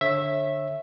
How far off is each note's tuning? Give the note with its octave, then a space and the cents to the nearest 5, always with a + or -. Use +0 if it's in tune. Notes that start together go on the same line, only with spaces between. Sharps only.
D3 +0 C#5 -25 E5 +0